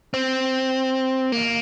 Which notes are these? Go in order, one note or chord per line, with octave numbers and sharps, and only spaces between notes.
C4
A#3